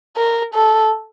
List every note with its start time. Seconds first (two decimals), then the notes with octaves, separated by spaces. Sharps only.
0.17 A#4
0.54 A4